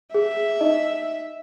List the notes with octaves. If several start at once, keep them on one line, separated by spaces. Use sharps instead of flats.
G#4 E5
D#4 D#5